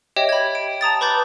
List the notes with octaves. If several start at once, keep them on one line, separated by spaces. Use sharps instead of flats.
G4 C#5 D#5 E5 G5
B5 G#6
D7
A5 A#5 D#6 A6
B4 B5 D6 G6 A6